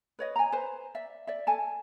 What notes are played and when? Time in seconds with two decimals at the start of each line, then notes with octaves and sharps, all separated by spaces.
0.19 B4 C#5 D#5
0.36 G#5 A#5
0.52 B4 C5
0.95 D5 E5
1.27 D5 E5
1.47 A4 G#5 A5